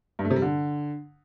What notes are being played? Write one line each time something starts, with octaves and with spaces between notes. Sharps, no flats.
G2
A3
C3
G3
D3